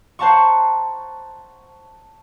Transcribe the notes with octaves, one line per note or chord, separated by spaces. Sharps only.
C5 F#5 A5 A#5 C#6